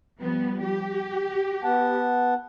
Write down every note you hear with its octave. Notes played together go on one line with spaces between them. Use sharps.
F3 G3 B3
G4
B3 F#5 A5